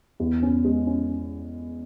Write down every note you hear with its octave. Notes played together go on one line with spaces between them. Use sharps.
E2
C#4
G#3
C#4